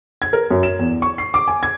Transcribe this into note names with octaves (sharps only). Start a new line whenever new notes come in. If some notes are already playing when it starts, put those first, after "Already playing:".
G#6
A#4
F#2
E7
E2
C#6
C7
D6
G#5
G#6